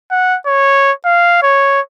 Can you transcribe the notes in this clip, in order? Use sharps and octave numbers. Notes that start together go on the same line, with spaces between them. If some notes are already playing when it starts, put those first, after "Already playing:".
F#5
C#5
F5
C#5